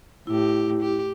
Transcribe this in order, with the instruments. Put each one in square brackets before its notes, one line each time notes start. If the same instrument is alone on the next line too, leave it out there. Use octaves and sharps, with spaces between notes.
[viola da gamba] A2 G4 [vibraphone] E4
[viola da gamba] G4